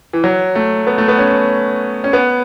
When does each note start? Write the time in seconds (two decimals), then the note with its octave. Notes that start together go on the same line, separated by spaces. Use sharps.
0.13 E3
0.24 F#3
0.55 A3
0.87 B3
0.98 A3
1.08 B3
1.18 C#4
2.04 C#4
2.13 B3